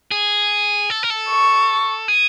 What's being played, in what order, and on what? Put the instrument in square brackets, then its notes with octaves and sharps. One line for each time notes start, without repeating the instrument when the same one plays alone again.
[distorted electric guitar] G#4
A4
A#4
A4
[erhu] C#6
[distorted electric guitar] G#4